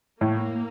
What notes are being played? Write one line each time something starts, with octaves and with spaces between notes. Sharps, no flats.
A2 A#3